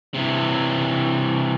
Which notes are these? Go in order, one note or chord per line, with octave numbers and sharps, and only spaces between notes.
C3 E3